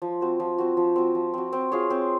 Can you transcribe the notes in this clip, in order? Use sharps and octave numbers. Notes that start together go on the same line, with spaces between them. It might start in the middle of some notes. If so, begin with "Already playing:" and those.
F3
C4 F#4
F3
C4 F#4
F3
C4 F#4
F3
C4 F#4
C4
F4 G#4 C#5
C4